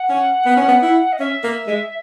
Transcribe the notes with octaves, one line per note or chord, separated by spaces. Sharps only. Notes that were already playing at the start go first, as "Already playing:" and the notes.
Already playing: F#5
C#4
B3
C#4
B3
E4
D#5
C#4 E5
A#3
G#3